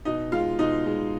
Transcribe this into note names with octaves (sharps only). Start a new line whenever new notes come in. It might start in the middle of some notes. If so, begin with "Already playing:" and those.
B2 D#4 D#5
G#3 F4 F5
B2 D#4 D#5
G#3